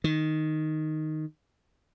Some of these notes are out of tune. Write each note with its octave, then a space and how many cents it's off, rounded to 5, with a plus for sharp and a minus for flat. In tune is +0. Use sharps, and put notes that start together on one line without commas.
D#3 -5